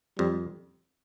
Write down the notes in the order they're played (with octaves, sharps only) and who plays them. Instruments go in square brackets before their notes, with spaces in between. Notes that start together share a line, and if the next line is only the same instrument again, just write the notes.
[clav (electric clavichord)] F2 [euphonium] G3